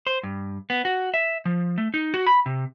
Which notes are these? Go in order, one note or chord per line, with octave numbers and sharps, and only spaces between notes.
C5
G2
B3
F#4
E5
F3
A3
D#4
F#4
B5
C3